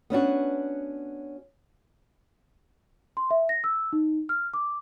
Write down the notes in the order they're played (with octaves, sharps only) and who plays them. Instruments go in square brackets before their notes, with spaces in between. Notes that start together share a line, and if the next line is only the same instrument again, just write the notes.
[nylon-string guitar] B3 C#4 D4 F#4
[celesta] C6
E5
A#6
E6
D#4
F6
D6